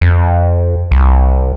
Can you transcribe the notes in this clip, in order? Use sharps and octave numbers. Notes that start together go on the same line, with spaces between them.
F2
C2